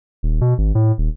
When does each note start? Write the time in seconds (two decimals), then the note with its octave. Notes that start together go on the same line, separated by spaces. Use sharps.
0.23 D#1
0.41 B2
0.58 G#1
0.75 A2
0.98 D#1